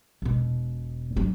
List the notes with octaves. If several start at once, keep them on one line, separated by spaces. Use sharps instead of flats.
E1 B2
F#3 D4